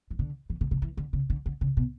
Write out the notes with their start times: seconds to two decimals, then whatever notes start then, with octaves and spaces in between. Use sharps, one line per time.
0.11 E3
0.19 D3
0.50 E3
0.61 D3
0.71 C#3
0.82 E3
0.97 D3
1.13 C#3
1.30 D3
1.46 D3
1.61 C#3
1.77 B2